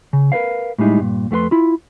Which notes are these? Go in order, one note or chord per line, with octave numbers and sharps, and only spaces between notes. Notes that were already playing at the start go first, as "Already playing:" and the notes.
C#3
A#4 B4 C#5 F5
A2 G3 G#3 D#4 E4
G2 A#2
F2 A3 F4 B4 C6
E4 F4